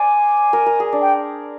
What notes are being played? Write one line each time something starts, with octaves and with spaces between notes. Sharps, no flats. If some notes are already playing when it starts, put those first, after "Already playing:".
Already playing: C5 D5 G#5
A#4
A#4
G#4
D4
G5